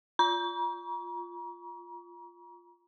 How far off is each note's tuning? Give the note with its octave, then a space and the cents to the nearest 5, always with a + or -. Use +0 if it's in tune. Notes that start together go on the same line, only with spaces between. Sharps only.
F4 +0 A#5 +40 C#6 +40